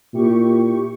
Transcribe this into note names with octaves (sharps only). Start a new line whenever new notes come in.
A#2 E4 G4 C#6